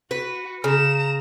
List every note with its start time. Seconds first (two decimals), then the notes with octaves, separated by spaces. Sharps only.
0.11 F#4 B4
0.64 C#3 A#5 E7